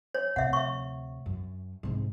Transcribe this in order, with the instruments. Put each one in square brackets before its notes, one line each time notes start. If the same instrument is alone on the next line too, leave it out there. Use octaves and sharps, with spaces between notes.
[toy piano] C#5
[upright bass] D2 C3 [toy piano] E5 F#5
[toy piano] E5 C#6
[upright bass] F#2
G#2 C3